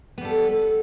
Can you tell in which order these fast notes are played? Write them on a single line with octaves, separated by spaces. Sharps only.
B3 G3 A4